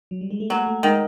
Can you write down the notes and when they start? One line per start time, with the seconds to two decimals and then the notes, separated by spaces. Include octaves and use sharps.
0.11 F#3
0.21 G3
0.31 G#3
0.40 A3
0.50 F#3 A#3
0.67 A3
0.83 D#3 G#3